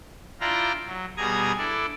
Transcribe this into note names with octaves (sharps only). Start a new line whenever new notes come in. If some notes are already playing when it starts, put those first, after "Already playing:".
D4 E4 F4 D5 G5 A#5
F#3
B2 G3 G#4 A#5 D#6 G#6
D4 E4 A4 D5